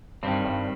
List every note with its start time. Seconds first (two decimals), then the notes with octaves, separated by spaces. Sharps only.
0.23 G2 D#3 G3 C4
0.45 G2